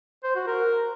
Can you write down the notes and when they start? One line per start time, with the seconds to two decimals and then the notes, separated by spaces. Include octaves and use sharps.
0.24 C5
0.35 F#4
0.47 A#4